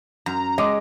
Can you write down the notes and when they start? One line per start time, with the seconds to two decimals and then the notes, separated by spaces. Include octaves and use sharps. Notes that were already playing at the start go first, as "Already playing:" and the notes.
0.26 F#2 A#5
0.58 G#3 D#5 D6